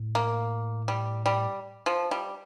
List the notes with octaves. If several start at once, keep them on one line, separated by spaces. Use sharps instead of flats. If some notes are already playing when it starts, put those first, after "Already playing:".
Already playing: A2
A#3
G3
G3
F3
G3